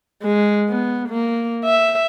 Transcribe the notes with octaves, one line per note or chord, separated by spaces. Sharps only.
G#3
B3
A#3
E5